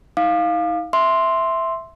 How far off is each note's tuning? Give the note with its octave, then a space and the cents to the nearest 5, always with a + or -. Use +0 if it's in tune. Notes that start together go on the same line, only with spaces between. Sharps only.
D#4 +40 F5 +5 D6 +40
E5 +0 C6 +0 E6 +0